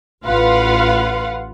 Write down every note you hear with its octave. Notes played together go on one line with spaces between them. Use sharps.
A1 F4 B4 F5 F#5